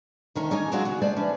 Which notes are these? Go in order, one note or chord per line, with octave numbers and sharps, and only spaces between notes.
D2 D#3 C#4 D#4
C#4 D#4 G4 C#5 G#5
F#3 G#3 C4 F4 F#4 C5
C#3 F#4
G#3 A3 C5 D5
E3 C#4 D4